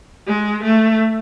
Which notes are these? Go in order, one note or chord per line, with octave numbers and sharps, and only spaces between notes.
G#3
A3